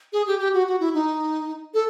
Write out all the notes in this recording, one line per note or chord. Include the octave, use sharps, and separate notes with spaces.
G#4
G4
G4
F#4
F#4
E4
D#4
A4